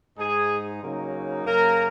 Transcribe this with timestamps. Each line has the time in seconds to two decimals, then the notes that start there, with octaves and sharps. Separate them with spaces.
0.18 G#2 G#3 D#4 G#4
0.82 C#3 F#3 A#3 D#4
1.46 F#2 C#3 F#3 A#3 A#4